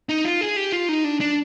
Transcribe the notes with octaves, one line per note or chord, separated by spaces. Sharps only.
D#4
F4
G#4
G4
F4
D#4
D4
D4